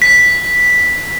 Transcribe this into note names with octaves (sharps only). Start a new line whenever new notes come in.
B6